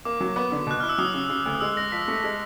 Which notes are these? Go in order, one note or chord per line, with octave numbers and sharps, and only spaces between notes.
A#3 D6
F#3
B3 D6
D3
B2 F#6
E4 F6
E6
F#3 D#6
C#3
C#3
D2
D#6
G#3 E6
G#3 A#6
F3 B6
A3
G#3